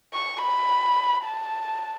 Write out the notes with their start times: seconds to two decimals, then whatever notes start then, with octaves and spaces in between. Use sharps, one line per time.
0.14 C#6
0.42 B5
1.26 A5